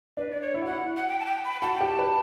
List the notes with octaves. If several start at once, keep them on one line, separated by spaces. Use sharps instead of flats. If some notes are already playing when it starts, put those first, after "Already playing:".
D4 B4
D5
C#5
E4
F#4
E4 F#5
F#5
G5
A5
G5
B5
F#4 A5
G5
G4
A5
B4